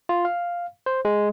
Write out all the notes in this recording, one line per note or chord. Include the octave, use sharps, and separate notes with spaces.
F4
F5
C5
G#3